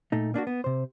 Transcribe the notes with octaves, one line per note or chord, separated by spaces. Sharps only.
A#2 A3 D#4
A#3 D4 D#4 F#4
B3
C3 C5